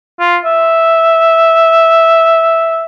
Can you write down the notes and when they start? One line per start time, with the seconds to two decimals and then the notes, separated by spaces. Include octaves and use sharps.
0.20 F4
0.45 E5